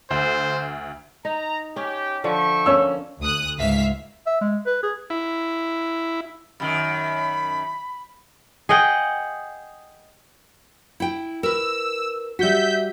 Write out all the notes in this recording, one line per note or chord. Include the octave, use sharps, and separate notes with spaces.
D2 C5
D#4 A#5
C#4 G4
D3 F3 E5 G5 C#6
A#3 C#4 E6
D2 D#6 F#6
C#2 G#2 E5 F5 B6
E5
G#3
B4
G#4
E4
F#2 D#3 B5
G#4 D#5 F#5 G5
E4 G5
A#4 B4 E6
G3 F#4 E5 G6 B6